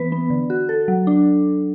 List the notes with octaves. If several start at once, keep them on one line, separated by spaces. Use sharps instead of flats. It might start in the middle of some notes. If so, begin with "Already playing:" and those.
Already playing: E3 B3 B4
B3
D3
F#4
A4
F#3
D4